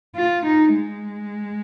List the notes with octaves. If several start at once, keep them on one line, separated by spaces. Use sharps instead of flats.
F4
D#4
G#3